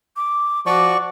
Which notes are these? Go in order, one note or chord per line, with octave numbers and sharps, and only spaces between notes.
D6
F3 F#4 D5 C#6 D6